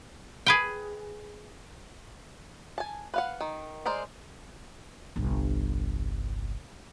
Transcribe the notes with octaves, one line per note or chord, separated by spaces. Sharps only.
G#4 B4 G5
G#5 A5
B4 F5 F#5
D#3
G#3 A#4 C5 D5
G1 C2